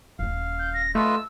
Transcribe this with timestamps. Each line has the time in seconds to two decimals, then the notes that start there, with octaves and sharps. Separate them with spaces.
0.19 D#1 C#4 F5
0.59 G6
0.74 A#6
0.95 A3 F4 B4 D#5 E6